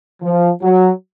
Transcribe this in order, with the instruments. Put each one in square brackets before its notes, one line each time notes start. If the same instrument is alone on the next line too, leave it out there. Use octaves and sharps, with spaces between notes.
[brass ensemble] F3
F#3